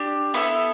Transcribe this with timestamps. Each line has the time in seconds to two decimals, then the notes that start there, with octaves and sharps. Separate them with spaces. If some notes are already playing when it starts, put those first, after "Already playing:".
Already playing: D4 G4
0.34 B3 E4 A4 B5